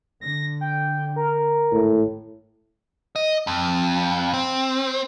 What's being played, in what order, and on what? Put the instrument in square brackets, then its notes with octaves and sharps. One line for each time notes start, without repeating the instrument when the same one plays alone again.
[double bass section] D3 [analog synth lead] A#6
[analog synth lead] G5
A#4
[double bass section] G#1 [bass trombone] A2
[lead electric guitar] D#5
F2
C4